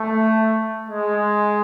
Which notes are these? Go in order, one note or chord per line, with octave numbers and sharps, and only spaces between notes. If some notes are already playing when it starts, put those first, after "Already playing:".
Already playing: A3
G#3